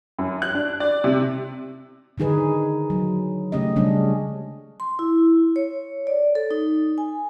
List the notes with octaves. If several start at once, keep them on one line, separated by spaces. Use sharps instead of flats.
F#2
F#6
D4
D5
C3
D3 D#3 D#4 G#4 B4
F#3
C#3 A3 C#4 G4 D#5
C#3 G3 G#3 C#4 D4
C6
E4
C#5
D5
A4
D#4
G#5